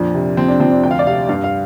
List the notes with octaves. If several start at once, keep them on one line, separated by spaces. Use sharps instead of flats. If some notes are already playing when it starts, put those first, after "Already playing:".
Already playing: F2 A#2 D4
C3
F3 C4
D4
F3 C4
D4
D2 G5
F5
D5
C3 F5
G2 F5
F5